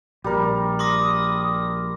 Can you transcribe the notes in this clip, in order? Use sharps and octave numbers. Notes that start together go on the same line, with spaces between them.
A#1 G3 A#4
C6 D6 D#6 A#6